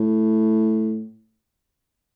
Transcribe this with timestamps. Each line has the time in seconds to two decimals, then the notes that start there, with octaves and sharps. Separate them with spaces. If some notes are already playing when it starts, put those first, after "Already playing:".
Already playing: A2